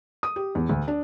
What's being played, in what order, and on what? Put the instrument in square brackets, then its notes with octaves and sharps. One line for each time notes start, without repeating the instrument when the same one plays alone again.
[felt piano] D#6
G4
E2
D2
D4